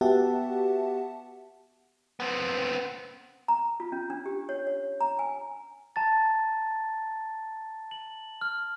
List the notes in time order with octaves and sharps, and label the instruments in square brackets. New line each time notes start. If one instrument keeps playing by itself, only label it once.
[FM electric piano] B3 F#4 G4 E5 F#5 A5
[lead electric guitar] B3 C4
[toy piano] A#5
F4
C#4
D4
G4
C#5
C#5
A#5
G#5
[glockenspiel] A5 A#5 A6
F#7
F6